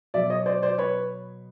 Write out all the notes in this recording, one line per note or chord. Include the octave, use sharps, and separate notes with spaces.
B2 F#3 B3 D5 E5
C#5 D#5
C5 D5
C5 D5
B4 C#5